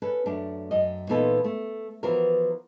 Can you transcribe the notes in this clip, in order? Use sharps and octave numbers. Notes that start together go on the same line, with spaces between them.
C#4 A4 B4
F#2 A3 D4
F#2 D#5
A#2 E3 B3 D#4 F4 A4
A3
E3 F3 B3 F4 F#4 A#4